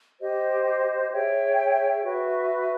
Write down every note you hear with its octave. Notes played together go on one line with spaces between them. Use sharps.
G4 C5 D#5
G#4 C#5 E5 G5
F#4 B4 E5